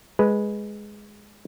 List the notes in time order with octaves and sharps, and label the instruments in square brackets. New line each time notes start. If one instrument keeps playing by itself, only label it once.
[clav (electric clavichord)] G#3 B4